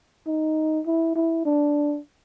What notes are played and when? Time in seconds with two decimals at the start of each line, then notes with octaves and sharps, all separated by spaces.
0.27 D#4
0.86 E4
1.15 E4
1.45 D4